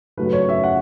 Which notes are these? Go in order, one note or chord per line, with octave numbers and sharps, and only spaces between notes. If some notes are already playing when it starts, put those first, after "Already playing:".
F#2 C#3 F#3 A3 B4
C#5
E5
F#5